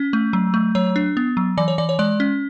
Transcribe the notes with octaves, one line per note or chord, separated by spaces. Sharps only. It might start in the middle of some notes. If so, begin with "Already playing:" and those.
Already playing: C#4
A3
F#3
A3
F#3 C#5
D4
B3
F#3
E3 D5
C#5
E3 D5
C#5
G#3 D5
C#4